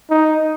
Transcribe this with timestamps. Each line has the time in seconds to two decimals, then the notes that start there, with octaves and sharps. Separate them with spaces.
0.10 D#4